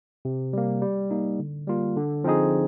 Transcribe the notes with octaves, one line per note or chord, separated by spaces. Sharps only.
C3
G3 A#3
G3
A#3 D#4
D3
G3 A#3 F4
D3
F3 C4 D#4 G#4